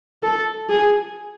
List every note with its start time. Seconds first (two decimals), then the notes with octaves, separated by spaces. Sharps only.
0.23 A4
0.69 G#4